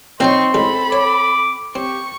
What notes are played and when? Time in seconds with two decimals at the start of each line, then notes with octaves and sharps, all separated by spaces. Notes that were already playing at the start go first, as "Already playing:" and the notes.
0.20 A#2 F#3 C4 D#4 A#5 C6 C#6
0.54 A1 D2 G#3 A4 B5
0.92 C#5 D6
1.75 C4 G4 C#6